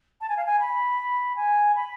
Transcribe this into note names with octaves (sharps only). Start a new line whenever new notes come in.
A5
G#5
F5
G#5
B5
G#5
B5